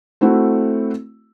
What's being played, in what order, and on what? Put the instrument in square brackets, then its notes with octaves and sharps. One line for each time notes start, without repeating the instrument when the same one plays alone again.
[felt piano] A3 C4 E4 F#4 A4